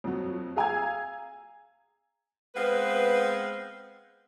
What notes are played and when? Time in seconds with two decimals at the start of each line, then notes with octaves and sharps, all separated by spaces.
0.04 F2 F#3
0.56 G#4 F5 G#5 A#5 E6 G#6
2.55 G#3 B3 C4 B4 F5